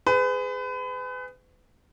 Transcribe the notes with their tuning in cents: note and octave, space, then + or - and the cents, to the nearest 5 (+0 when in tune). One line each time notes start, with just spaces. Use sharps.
G#4 +0 B4 +35